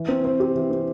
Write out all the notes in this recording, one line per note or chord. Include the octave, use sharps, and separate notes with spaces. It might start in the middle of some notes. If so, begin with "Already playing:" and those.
Already playing: E3
C4
C5
G4
E3
C4